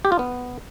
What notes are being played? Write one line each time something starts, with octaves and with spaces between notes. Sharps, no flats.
G4
F4
B3